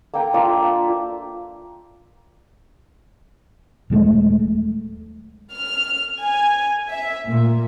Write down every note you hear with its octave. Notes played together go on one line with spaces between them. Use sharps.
A#3 A4 G5 A#5
A#3 D4 F4 E5
D#1 F#3 G#3 A3
F6
G#5
E5
A#2